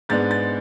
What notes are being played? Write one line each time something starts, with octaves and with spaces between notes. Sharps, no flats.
G#2 G#3 B3 D4 A6
A6